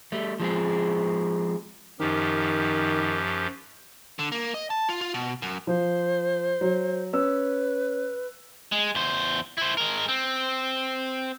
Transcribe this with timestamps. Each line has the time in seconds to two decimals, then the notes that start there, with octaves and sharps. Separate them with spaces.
0.12 G3 A3
0.40 F3 G#3 C4 G#4
2.00 F#2 D#3 F3 G4
4.19 D3
4.32 A#3
4.54 D#5
4.70 A5
4.89 F4
5.01 F4
5.14 B2
5.42 F#2
5.67 F3 C5
6.61 F#3
7.13 C#4 B4 E6
8.72 G#3
8.95 E2 C5
9.58 E4 C5
9.77 G#3 A#4
10.08 C4